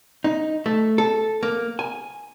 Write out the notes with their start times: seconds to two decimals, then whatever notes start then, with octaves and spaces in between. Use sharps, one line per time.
0.24 D#4
0.66 A3
0.98 A4
1.43 A#3
1.79 G#5